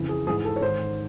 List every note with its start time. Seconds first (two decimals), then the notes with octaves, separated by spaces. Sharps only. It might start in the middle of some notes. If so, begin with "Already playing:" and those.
Already playing: F2 C#3 E3
0.09 G#4
0.27 G#2 E3 G#4
0.45 A4
0.56 C#5
0.61 G#2 D#3 C5